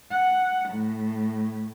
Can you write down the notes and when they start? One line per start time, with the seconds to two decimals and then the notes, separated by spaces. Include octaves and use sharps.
0.10 F#5
0.69 A2